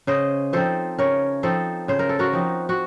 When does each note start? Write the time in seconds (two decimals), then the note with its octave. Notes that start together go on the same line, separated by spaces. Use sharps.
0.07 C#3 C5 D#5
0.53 F3 C4 D#4 A4 C5
0.99 C#3 A#4 C#5
1.43 F3 C4 D#4 A4 C5
1.88 C#3 C5
1.99 A#4
2.09 A4
2.19 F#4 A#4
2.33 F3 C4 D#4
2.69 F#4